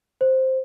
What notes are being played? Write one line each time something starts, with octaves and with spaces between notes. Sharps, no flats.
C5